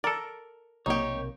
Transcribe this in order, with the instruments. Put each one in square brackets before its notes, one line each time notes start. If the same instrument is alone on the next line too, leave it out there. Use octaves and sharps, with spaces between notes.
[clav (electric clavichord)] A4 D5 [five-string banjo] A#4
[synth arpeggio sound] B1 C3 A#3 [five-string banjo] D#4 G4 [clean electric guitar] C#5